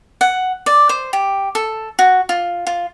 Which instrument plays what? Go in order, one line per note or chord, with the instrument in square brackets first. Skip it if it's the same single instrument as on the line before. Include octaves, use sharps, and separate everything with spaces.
[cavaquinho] F#5
D5
C5
G4
A4
F#4
F4
F4